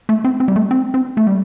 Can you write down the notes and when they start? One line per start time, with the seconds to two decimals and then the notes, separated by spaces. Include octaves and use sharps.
0.09 A3
0.24 C4
0.40 C4
0.48 G3
0.56 A3
0.71 C4
0.94 C4
1.17 A3
1.27 G3